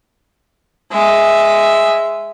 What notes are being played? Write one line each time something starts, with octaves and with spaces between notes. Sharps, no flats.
G#3 E5